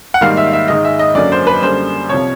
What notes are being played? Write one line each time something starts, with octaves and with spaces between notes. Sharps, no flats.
F#5
G#2 D#3 G3 A#3 F5
E5
E5
G#2 D#3 G#3 D#5
E5
D#5
F#2 D3 F#3 A#3 D5
C5
B4
F#2 D3 G3 A#3 C5
C2 C3 F3 C#5